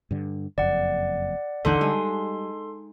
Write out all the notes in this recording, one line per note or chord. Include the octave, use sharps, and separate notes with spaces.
G2 D3
F#1 F2 D5 F#5
A1 D#2 D3 E3 D#4 A4 F#5 C6
G3 G#3